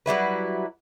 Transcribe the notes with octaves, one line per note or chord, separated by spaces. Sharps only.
F#3 G3 E4 B4